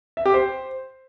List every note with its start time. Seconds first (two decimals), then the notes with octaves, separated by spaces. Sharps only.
0.17 E5
0.26 G4
0.34 C5